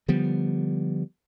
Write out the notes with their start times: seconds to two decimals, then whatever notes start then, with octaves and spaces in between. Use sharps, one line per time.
0.08 D3 F3 G3 B3